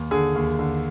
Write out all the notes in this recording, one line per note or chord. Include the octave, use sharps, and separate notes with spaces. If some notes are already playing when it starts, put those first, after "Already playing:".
Already playing: D#2
D3 G#4
D#2
D3